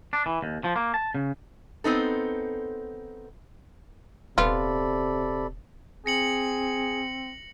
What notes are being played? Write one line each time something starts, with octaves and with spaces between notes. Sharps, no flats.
D4
E3
D#2
F3
A#3
A5
C#3
B3 C4 D#4 A4
D#1 C3 B3 F4 A4 D5 B5
C4 G#4 A#6 C#7 F#7